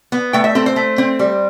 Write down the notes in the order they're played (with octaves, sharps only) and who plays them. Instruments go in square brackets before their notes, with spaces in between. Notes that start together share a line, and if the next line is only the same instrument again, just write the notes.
[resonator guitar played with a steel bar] B3
A3 G5
E5
C4 A4
C5
A3
C4
G3